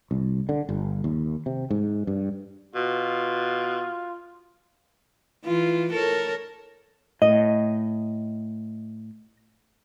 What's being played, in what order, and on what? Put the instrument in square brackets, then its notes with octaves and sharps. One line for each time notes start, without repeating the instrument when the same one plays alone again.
[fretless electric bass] C2
D3
G1
D#2
C3
G#2
G2
[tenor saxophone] B2 [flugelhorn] F4
[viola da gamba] E3 F4
A4 A#4 C#5
[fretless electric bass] A2 [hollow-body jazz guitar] D#5